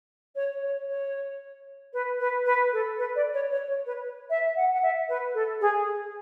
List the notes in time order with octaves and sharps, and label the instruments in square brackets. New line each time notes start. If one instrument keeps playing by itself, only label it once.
[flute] C#5
C#5
C#5
B4
B4
B4
A4
B4
D5
C#5
C#5
C#5
B4
E5
F#5
F#5
E5
B4
A4
G#4